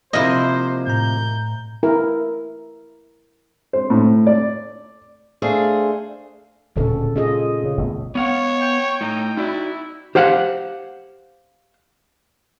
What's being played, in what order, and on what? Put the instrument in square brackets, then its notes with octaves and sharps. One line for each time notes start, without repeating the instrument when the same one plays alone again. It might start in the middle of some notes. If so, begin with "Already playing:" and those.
[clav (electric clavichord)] C3 F3 A#3 [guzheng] E4 D#5 [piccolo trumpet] C5
[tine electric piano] A2 A#5 [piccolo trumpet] G6
[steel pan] E4 A#4
[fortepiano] C5
A2
D5
[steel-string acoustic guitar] A3 D4 G#4 C5 F5
[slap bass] D1 C#4 [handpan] A#2 C#3 A4
[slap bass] C#4 [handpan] F4 G#4 D#5
[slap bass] C#3
G1 B2 A3
[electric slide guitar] B3 F5 F#5 [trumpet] C#5
[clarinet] G5
[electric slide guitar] A2 [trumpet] D#4
[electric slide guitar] D#4 F#4 D5 [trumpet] E4
[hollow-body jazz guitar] G4 C5 F5 F#5